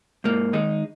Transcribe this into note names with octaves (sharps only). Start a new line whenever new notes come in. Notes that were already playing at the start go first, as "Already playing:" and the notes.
G#2 A#3
D#3 G#3 D#4